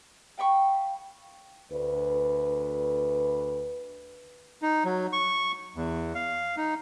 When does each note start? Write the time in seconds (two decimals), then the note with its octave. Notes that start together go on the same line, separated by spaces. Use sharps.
0.38 F5 G5 B5 C#6
1.72 D2 B4
4.62 D#4
4.85 F#3
5.13 C#6
5.76 E2
6.15 F5
6.57 D#4